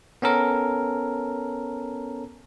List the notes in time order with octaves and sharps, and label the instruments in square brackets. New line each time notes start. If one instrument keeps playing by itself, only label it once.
[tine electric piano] B3 C#4 A4 A#4